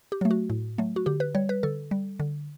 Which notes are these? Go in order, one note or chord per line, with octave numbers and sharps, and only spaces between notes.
G4
F#3 A3
F#4
A2
F#3 A3
F#4
D3 G4
B4
G3 C#5
B4
D3 A4
G3
D3